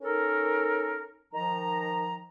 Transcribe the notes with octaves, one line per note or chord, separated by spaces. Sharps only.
C#4 D#4 A4 A#4
D#3 F3 A#5